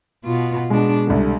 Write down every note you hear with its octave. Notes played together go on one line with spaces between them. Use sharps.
B2 F4
B2 G#3 D4
C2 D3 G#3